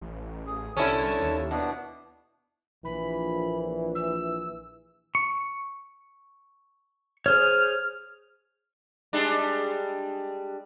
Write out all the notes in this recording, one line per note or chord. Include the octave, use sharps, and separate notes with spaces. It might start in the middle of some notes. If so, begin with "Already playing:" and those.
A1
G#4
C2 D3 C#4 E4 A5
D#2
B2 B3 D4
A#1 E3 B5
E6
C#6
G#4 C5 C#5 F6
G3 G#3 D4